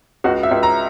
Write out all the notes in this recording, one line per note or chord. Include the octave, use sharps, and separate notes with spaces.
C#2 F#4
E5
C#2
A#5